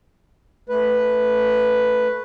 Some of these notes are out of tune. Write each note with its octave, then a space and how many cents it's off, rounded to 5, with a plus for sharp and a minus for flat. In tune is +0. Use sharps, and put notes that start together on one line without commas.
A3 +0 B4 +0